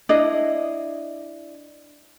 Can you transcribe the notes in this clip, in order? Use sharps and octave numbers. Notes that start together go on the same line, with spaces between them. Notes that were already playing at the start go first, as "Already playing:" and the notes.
D4 E4 D#5